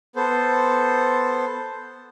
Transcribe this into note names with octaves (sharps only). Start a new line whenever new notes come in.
B3 A4 C5